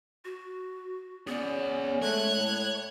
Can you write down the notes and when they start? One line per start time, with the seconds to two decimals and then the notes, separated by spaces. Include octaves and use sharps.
0.25 F#4
1.27 B3 C#4 G#4 D5
2.02 G#3 A3 C#5 F#6 G#6
2.36 A2